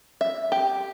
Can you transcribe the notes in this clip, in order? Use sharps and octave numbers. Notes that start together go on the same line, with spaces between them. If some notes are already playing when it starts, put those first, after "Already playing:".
E5
G4